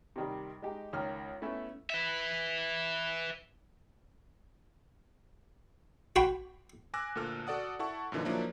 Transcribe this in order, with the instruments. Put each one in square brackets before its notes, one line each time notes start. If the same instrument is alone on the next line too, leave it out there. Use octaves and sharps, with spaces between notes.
[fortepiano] C3 D#3 G3
G#3 D#4 G4
C#2 D#3 F6
A3 B3 C#4 E4
[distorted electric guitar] B4 E5
[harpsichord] F#4 G5 B5 C6
[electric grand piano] G#5 D6 E6 F#6 A#6
D2 A#2 A4 F6
F#4 A4 D5 F#5 D#6
E4 A4 F#5 A5 C#6
F#2 A#2 D3 E3 D#4
F3 F#3 A#3 D4 E4